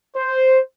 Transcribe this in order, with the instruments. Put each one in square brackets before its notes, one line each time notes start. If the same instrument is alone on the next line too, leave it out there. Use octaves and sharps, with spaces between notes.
[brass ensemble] C5